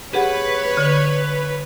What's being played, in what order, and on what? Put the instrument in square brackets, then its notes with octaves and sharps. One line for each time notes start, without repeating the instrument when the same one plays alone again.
[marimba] G4 G#4 F#5 [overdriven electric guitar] B4 [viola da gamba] C#5
[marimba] D3